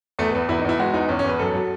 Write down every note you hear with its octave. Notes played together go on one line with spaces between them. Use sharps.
E2 A3
B3
E2
E2 E4
D#4
E2 E4
G#3 F#4
E2 D#4
E2 C#4
C#4
E2 B4
F#2 A4
F#3